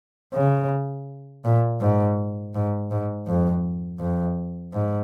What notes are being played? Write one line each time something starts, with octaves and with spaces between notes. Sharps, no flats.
C#3
A#2
G#2
G#2
G#2
F2
F2
G#2